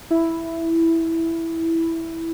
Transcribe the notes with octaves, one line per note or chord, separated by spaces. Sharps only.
E4